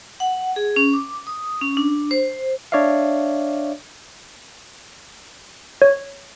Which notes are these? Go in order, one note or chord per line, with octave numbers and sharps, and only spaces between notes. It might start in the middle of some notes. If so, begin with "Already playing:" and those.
F#5
G#4
C#4
D6
D#6
C#4
D4
C5
D4 C#5 D5 E5 F5
C#5